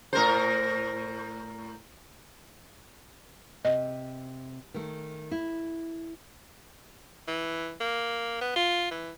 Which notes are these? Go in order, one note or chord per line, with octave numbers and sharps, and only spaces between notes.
A2 A#4 C5
C3 D#5
D#3 A3
E4
E3
A#3
B3
F4
E3